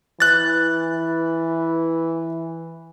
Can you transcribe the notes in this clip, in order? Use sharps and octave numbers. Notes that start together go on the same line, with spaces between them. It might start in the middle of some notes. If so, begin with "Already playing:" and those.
E3 F#6 A6